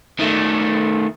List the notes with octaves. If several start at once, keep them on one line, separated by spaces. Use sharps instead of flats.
D#3 A3